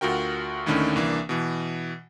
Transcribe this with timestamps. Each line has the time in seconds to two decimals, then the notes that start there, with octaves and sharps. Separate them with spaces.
0.01 D2 F4 F#4 A#4 G5
0.66 D#2 A2 D3 D#3 C#4 D4
0.96 C2 E3 A#3 D4
1.29 B2 E3